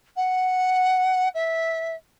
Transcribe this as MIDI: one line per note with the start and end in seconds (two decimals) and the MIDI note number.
0.16 1.28 78
1.34 1.95 76